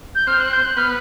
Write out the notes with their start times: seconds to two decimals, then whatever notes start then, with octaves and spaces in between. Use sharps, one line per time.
0.14 G6
0.27 C4 C5 F6
0.39 F#6
0.52 G6
0.64 F#6
0.77 B3 B4 F6